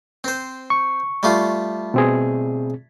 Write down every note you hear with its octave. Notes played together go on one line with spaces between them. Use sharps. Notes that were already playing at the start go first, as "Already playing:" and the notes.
C4 C5
C#6
G3 A3 F4
B2 C4 G#4